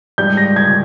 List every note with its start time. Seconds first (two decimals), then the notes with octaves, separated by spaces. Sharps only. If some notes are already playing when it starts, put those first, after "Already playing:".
0.18 G#2 G3 G6
0.37 A#6
0.56 G#6